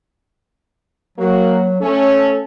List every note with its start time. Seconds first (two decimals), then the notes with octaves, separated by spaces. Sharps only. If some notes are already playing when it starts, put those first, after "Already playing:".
1.18 F#3 A#3 F#4
1.81 A3 C#4 A4